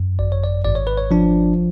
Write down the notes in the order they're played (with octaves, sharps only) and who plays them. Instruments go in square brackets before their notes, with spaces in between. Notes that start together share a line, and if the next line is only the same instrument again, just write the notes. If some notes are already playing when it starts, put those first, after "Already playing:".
Already playing: [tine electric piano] F#2
G#1 D5
C#5
D5
G#1 D5
C#5
B4
C#5
F3 D4